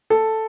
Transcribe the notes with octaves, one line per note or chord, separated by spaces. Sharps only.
A4